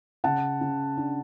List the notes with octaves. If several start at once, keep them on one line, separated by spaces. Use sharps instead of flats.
C#3 F#5 A5
C#3
D4